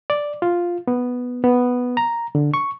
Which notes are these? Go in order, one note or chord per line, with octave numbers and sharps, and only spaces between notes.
D5
F4
B3
B3
A#5
D3
C#6